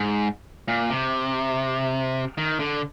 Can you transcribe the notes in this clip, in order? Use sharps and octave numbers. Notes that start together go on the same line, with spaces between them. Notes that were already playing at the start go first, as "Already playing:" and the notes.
Already playing: G#2
A#2
C3
D#3
D3